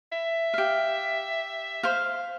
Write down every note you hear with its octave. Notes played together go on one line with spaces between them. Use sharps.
E5
G4 F5
C5 F5